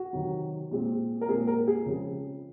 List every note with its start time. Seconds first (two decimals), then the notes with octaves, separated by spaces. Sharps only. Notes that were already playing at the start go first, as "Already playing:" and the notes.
Already playing: F#4
0.13 C3 D#3 F#3
0.71 A#2 G#3 C4
1.21 A#4
1.28 A#2 G#3 C4 G#4
1.47 A#4
1.68 G#4
1.86 C#3 F3 G#3 C4